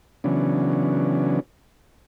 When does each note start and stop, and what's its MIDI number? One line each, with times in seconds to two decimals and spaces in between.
0.24 1.40 49
0.24 1.40 52
0.24 1.40 54
0.24 1.40 59
0.24 1.40 61
0.24 1.40 62